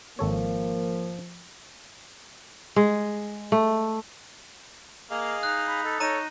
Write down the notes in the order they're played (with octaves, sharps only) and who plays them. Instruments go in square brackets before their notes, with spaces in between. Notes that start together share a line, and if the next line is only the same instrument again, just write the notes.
[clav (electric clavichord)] G#1 A4 C#5 [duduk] F3 [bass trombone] A#3
[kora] G#3
A3
[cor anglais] A#3 [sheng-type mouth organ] G#4 D#5 F5
[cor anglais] D#4 [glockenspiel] F#6
[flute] B5
[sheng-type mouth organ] A4
[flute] D#4 [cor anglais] C#5 [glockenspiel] A#5 D#7